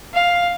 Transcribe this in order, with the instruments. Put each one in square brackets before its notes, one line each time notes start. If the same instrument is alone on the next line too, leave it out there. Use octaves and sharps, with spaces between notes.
[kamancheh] F5